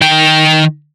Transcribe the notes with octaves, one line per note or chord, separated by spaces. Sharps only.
D#3 G5